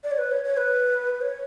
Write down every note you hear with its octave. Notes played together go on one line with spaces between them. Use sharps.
D5
C#5
B4
C#5
C#5
B4
B4
C#5